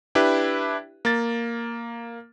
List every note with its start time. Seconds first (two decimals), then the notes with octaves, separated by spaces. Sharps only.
0.15 D4 E4 G4 B4
1.05 A#3 A6